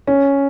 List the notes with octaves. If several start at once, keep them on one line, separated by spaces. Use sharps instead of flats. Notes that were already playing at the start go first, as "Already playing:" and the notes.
C#4